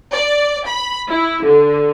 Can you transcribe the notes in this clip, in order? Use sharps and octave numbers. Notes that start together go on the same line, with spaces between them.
D5
B5
E4
D3